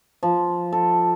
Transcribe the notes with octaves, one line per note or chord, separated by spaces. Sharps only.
F3
A4